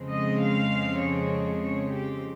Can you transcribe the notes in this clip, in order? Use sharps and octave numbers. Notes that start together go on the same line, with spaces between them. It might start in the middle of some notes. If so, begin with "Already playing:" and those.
Already playing: F2 C#3 F3 G#3 C4
D#5
F5
C#5
C#5
G4